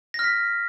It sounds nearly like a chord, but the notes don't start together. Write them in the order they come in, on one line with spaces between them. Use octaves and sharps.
A#6 F6 B6